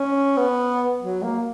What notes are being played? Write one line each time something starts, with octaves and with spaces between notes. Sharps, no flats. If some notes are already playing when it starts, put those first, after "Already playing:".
Already playing: C#4
B3
F#3
A#3